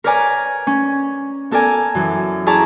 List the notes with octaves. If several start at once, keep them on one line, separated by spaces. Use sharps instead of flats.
A#4 B4 C#5 D5 G#5 A#5
C#4
B3 A4 A#4 D5 G#5
F#2 E3
E4 G#4 D5 A5 A#5 C#6